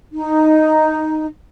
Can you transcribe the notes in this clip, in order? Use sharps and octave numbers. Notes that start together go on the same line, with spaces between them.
D#4